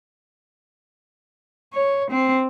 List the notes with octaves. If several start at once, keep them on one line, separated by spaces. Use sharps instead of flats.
C#5
C4